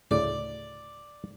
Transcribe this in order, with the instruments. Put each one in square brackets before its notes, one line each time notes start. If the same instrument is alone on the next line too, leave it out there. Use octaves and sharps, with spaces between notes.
[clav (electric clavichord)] D2 A2 C#3 [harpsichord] D5